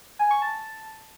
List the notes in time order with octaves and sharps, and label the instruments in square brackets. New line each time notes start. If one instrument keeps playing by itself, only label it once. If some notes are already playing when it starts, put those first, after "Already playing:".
[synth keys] G#5
C#6
A5